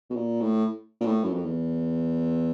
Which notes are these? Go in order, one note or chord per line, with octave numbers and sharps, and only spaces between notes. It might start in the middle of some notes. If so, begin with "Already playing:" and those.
B2
A#2
A2
A#2
A2
F#2
F2
E2